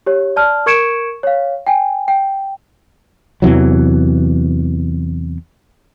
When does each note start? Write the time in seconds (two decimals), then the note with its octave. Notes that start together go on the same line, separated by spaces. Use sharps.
0.06 G4 C#5
0.36 D5 A5 F6
0.66 A#4 C#6 G#6 C#7 D7 E7
1.23 C#5 F5
1.67 G5 G#5
2.08 G5
3.42 E2 C3 E3 F#3